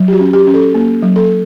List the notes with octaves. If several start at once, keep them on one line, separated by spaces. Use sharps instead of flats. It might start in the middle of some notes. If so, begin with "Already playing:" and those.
Already playing: F#3
G4
F#4
C#4
G4
C#4
A4
A#3
F#3
A4